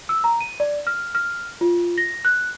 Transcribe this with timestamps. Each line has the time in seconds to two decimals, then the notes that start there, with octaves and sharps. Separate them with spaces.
0.09 E6
0.24 A#5
0.41 D#7
0.60 D5
0.87 F6
1.15 F6
1.61 F4
1.98 A#6
2.25 F#6